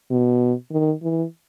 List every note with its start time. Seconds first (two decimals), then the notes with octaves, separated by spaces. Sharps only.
0.11 B2
0.71 D#3
1.03 E3